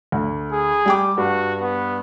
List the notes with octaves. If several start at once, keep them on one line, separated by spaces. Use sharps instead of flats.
D2
G#4
G3 G5 D6
G2 F#4
B3